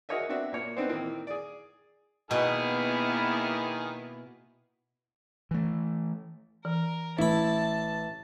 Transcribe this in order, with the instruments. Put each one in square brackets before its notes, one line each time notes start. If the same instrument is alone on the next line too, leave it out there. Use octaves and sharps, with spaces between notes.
[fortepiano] F#4 G#4 A#4 C#5 D#5 E5
B3 C4 D4 F#4 E5 F#5
A#2 A#3 C#5 D5
B3 C4 D4 D#4 C5
A#2 D#3 E3 A#3 C4
G#4 D5
[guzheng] B2 [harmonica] D#3 G#4 F6 [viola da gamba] A#3 B3 E4
[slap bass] E3 A3
[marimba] E3 [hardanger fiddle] A#4
[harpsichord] A1 B5 [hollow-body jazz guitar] E4 [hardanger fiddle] A5